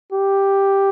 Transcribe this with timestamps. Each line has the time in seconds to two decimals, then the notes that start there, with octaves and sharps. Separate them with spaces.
0.12 G4